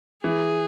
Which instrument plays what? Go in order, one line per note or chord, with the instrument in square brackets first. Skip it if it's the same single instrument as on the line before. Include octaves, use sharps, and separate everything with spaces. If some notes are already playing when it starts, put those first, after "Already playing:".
[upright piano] E3 [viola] G#4